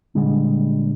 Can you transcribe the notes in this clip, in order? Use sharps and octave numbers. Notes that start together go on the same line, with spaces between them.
A#2 D3 G3 G#3